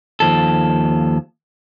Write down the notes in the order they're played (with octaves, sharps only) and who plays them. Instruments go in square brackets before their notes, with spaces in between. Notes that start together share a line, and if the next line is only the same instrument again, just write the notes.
[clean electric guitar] D#2 F3 A4